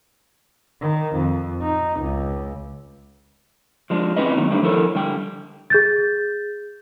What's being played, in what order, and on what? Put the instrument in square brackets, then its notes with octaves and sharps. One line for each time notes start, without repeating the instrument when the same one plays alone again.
[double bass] D#3
F2
D#4
C#2
[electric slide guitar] F3 G#3 D4
C4 C#4 E4 G#4 B4 D#5
D#3 F#3 B3 D#4
G3 A3 D4
F3 E4 A4 A#4 C#5
D3 G3 G5
[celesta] G#4 G6 A6